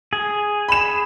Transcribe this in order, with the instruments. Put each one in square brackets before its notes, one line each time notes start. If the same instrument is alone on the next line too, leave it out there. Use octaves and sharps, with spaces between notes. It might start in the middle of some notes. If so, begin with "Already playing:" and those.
[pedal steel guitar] G#4
[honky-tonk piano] B5 E7